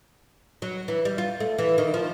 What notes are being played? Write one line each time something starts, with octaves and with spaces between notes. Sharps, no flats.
F#3
E3
G3
F4
A3
E3
D#3
F3